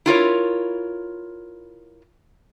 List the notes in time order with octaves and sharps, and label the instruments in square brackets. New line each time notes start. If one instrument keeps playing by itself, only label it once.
[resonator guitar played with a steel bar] E4 F4 A#4 C#5